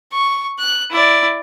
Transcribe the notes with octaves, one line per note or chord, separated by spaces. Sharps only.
C#6
F#6
E4 D5